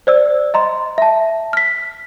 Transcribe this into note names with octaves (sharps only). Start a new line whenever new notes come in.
C5 D5 E6
D#5 A#5 C6
E5 A5
F6 B6